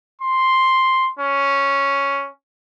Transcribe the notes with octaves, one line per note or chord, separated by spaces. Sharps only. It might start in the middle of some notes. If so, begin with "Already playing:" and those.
C6
C#4